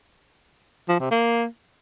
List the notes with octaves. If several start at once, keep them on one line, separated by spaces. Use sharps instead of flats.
F3
C3
A#3